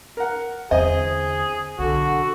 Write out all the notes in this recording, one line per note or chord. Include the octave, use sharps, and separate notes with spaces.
A#4 F#5
E2 D3 C4 G#4 D#5
B1 D3 F#4